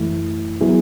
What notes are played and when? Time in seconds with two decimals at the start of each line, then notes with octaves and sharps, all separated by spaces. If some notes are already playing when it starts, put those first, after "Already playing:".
Already playing: F#2 E3 A3 E4
0.61 F#3 B3 E4 G#4